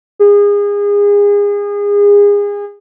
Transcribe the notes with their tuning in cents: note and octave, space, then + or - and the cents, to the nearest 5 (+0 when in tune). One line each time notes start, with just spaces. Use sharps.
G#4 -30